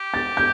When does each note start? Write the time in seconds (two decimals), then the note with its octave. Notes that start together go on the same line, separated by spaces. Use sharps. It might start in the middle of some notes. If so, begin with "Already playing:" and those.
Already playing: G4
0.14 A6
0.37 G6